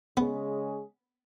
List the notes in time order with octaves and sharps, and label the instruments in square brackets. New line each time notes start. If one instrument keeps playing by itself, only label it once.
[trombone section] C#3 G#3 C#4 G#4 [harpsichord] B3